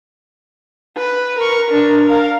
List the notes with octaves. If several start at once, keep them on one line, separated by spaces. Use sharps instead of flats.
B4
A#4 C#6
D4 A#4
A#4 F5